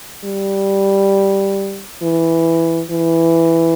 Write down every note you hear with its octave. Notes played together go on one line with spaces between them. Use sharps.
G3
E3
E3